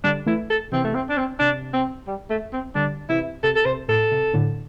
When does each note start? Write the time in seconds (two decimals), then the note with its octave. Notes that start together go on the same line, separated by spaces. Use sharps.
0.04 D3 G3 D4
0.26 E3 A3 E4
0.50 A4
0.72 C3 E3 C4
0.85 A3
0.94 C4
1.09 D4
1.18 C4
1.39 C3 D4
1.73 C4
2.07 G3
2.30 A3
2.53 C4
2.75 D3 G3 D4
3.09 C3 E3 E4
3.43 C3 A4
3.55 A4
3.65 C3 C5
3.88 A2 A4
4.12 C3
4.33 A2 D3